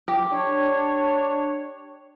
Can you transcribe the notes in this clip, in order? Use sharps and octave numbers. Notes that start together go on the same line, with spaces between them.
G4
D4 C#5